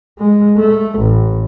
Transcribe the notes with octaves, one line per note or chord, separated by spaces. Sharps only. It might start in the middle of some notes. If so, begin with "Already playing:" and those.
G#3
A3
A1